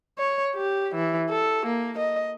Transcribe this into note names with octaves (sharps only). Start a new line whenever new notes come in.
C#5
G4
E3
A4
A#3
D#5